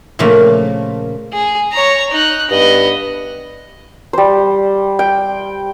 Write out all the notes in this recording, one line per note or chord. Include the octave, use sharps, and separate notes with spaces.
A#2 C#3 F3 A3 A#3
G#4
C#5 A#5
D#4 F#6
G2 B3 D#5
G3 C5
G5